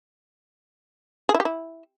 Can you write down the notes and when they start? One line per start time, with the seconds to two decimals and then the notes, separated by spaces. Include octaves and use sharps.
1.29 G#4
1.34 E4
1.40 G4
1.45 E4